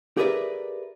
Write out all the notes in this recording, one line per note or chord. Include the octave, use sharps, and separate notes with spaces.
G4 G#4 A#4 B4 D5 E5